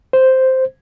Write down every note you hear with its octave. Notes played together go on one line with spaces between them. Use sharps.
C5